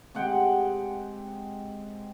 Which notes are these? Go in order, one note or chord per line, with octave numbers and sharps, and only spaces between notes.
C3 G#3 F#5 G5